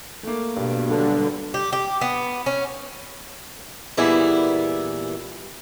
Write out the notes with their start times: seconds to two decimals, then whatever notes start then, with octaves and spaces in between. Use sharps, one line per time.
0.23 A3 A#3
0.56 G2 B2
0.90 D3 F#3 G3
1.54 G4
1.73 G4
2.01 B3
2.46 C#4
3.97 A#2 E3 G3 B3 E4 G#4